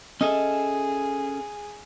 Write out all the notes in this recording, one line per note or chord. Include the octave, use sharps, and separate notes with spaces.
C#4 G#4 A4 D#5 E5